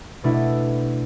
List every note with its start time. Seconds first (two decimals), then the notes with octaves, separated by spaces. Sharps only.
0.24 B2 A3 D4 E4 A4